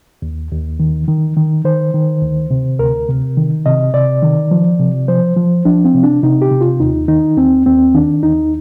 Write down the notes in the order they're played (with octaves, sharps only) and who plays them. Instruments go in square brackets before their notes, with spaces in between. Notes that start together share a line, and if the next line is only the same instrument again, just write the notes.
[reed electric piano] D#2
D#2
D#3
D#3
D#3
D#3 C5
D#3
D2
C3
D2 A#4
C3
D#3
C3 D#5
C3 D5
D#3
F3
C3
F3 C5
F3
F3 D4
C4
C3
D4
C3 D#4
G4
C3
F4
D#2 D#4
D#3 D#4
D#2 C4
D#2 C4
D#3 D4
D#2 D#4